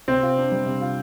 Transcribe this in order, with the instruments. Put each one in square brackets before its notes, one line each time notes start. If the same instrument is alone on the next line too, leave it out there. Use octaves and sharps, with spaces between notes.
[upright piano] C3 [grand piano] C4
[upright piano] F4
D4
G3
C3
F4